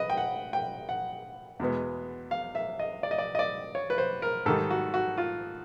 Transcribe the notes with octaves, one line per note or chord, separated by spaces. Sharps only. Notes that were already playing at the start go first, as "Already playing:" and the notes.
Already playing: B4 D#5
G5
F#5
G5
F#5
E2 B2 G#3 B3
F5
E5
D#5
D5
D#5
D5
D#5
D5
C#5
B4
C5
A#4
G#2 D#3 G3 A4
F#4
F#4
F4